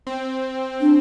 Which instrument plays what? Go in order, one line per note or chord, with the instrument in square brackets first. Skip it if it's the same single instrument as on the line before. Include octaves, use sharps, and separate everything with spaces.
[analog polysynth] C4
[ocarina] D4